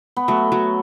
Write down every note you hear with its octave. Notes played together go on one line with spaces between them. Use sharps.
B3
F#3 A3
F#3